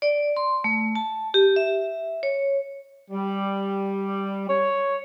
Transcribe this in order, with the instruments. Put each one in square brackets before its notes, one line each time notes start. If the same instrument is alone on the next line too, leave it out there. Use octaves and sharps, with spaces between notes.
[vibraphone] D5
C6
A3
A5
G4
E5
C#5
[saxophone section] G3
C#5